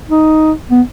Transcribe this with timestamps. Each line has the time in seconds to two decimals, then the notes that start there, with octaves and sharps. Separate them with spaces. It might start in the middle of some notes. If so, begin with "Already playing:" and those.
0.09 D#4
0.71 B3